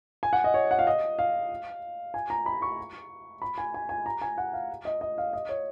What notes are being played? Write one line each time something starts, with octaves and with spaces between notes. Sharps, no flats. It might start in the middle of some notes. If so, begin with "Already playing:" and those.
G#5
F#5
D#5
C#5
F#5
F5
D#5
F5
G#5
A#5
B5
C#6
B5
G#5
G#5
G#5
A#5
G#5
F#5
F5
D#5
D#5
F5
D#5
C#5